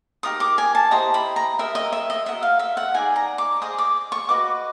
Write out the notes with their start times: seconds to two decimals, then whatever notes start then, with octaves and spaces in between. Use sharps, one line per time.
0.23 D#4 G4 A#4 D#6
0.40 D6
0.58 G#5
0.75 A5
0.91 E4 G4 C5 D#5 A#5
1.14 B5
1.36 A#5
1.58 G4 A#4 D#5 E5
1.75 D#5
1.93 E5
2.10 D#5
2.26 F#4 A#4 D#5 E5
2.43 F5
2.59 E5
2.77 F#5
2.94 D#4 G#4 B4 D5 G#5
3.16 A#5
3.38 D6
3.62 G#4 C5 D#5 D#6
3.78 D6
4.12 C#6
4.29 F#4 B4 D#5 D6